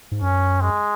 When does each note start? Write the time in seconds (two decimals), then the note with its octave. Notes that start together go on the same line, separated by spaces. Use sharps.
0.12 G#2
0.22 F#2 C#4
0.61 G#3